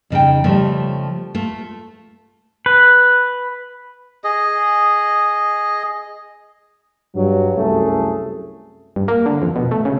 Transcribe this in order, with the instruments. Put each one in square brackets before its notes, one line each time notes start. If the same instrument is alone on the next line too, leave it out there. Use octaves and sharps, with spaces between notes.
[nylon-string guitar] F2 C#3 D#4 G5
C#3 F3 G3 A3
A3 F4
[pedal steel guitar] B4
[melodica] G#4 D#5
[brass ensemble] G2 F#3
C2 F#2 A3 G#4 A4
[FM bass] G2
A#3
D3
F2
B2
A3
C#3